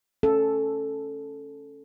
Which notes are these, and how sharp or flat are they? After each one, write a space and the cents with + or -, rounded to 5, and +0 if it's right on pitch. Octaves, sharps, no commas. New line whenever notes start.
C#4 +0 A4 +0